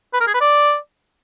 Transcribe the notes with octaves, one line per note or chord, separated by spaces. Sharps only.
B4
A#4
G#4
B4
D5